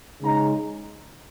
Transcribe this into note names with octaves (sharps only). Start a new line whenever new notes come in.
C#3 G#3 D#4 A#5